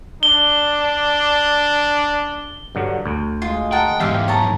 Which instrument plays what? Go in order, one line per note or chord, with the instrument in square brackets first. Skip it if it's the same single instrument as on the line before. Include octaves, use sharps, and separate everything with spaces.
[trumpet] D4 [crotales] G7
[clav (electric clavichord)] G2 D3 F#3
D2
[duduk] G#3 [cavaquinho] F4
[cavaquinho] A#4 F#5 A5 [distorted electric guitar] G5
[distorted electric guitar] E2 G#2 [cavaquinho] G4 C5 F5 [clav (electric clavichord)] E5
[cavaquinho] C#5 A5 A#5